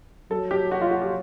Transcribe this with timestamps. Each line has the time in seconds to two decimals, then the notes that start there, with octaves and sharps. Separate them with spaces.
0.31 F#3 A4
0.51 G4
0.71 F#4
0.81 F4
0.91 F#4
1.01 G4